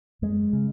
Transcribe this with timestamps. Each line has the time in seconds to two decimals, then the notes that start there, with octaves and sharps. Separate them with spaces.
0.22 F#2 G#3
0.53 C#3